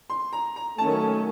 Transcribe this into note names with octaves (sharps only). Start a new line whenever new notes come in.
C6
A#5
A#5
D#3 F#3 A3 C#4 A5